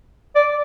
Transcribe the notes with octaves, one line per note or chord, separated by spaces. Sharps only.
D5